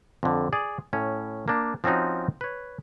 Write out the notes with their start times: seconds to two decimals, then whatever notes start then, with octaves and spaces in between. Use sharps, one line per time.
0.23 F2 D3
0.53 G#4 D5
0.93 A2 C#4
1.48 A#3 D4
1.84 F3 C4 C#4 D#4 F#4
2.41 B4 C#5